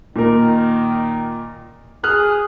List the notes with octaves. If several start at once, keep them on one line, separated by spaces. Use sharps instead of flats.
A#2 D#3 A#4
G#4 D#6 F6 F#6